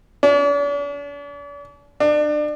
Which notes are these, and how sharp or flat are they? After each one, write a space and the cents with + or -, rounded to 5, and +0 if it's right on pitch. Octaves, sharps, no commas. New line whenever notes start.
D4 -45
D4 +30